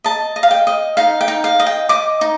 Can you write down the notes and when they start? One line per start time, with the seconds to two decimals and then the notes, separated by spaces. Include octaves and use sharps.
0.04 D#5 A5
0.36 D#5
0.43 F5
0.51 G5
0.67 D#5
0.97 D#4 F5
1.21 G5
1.28 D#4
1.44 F5
1.60 D#5
1.67 G5
1.89 D#5 D6
2.21 D#4